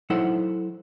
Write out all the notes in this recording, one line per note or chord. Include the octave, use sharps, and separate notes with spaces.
F#3 D#4 E4 A4 C5 F#5